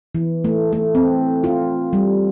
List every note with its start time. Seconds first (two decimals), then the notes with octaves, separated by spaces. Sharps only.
0.15 E3
0.44 A3
0.73 A3
0.95 C4
1.44 F4
1.93 G3